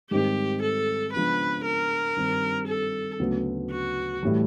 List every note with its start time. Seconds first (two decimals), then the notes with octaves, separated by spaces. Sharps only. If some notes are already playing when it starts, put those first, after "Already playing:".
0.10 G#2 D#3 G3 C4 D#4 G4
0.62 A4
1.13 C#3 F3 G#3 B3 D4 B4
1.65 A#4
2.16 G2 D#3 G3 C4
2.68 A4
3.20 D2 C#3 F#3 B3
3.70 F#4
4.23 A2 E3 G3